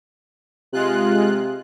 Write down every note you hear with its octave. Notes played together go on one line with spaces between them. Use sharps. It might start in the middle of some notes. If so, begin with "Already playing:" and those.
C3 G#3 F4 F#6